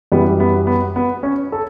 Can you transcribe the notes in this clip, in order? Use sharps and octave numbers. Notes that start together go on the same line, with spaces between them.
F#2 E3 G3 B3
B3
B3
B3
C#4
A4